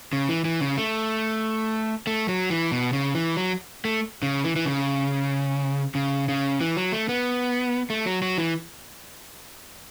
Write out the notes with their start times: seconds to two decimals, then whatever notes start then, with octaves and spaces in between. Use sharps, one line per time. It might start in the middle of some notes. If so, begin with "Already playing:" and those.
0.13 C#3
0.29 E3
0.45 E3
0.61 C#3
0.77 A3
2.07 A3
2.29 F#3
2.50 E3
2.72 B2
2.93 C#3
3.15 E3
3.37 F#3
3.85 A3
4.23 C#3
4.44 E3
4.56 E3
4.66 C#3
5.95 C#3
6.28 C#3
6.61 E3
6.77 F#3
6.92 A3
7.09 B3
7.90 A3
8.06 F#3
8.22 F#3
8.38 E3